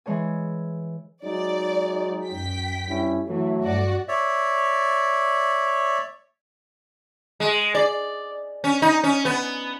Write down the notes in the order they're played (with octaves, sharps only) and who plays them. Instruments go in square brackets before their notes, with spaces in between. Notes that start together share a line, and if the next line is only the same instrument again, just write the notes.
[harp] E3 G#3 C#5 G#5
[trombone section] F#3 G#3 D#4 [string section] D5
[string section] F#2 G5 B6
[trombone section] G2 C#4 E4
[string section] E3 [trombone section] F#3 A3
[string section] G2 F#4 D5
[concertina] C#5 D5 E5
[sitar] G#3
D5
C#4
D#4
C#4
B3